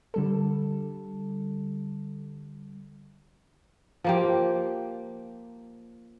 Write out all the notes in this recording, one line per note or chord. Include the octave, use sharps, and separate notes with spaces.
D3 G3 A4
F3 A#3 G4